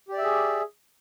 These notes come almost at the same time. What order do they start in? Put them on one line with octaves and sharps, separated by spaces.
G4 D5 E5 G#4